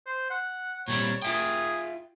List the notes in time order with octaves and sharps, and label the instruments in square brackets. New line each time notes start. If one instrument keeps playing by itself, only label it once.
[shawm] C5
F#5
[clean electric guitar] A#2 G3 C4 [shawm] C#5
[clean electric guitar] F4 E5 G5 [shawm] G#4